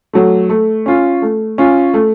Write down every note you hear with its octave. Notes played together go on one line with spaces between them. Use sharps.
F#3 A3
A3
C#4 F4
A3
C#4 F4
A3